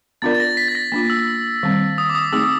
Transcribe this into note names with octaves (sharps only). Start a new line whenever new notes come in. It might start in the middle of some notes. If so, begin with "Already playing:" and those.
B3 D4 F4 A#4 D5 A6
A6
A#6
B6
A6
A#6
A#3 D4 F4
E6
D#3 G3 C4
D#6
D6
D#6
A3 C4 D#4 G#4 E6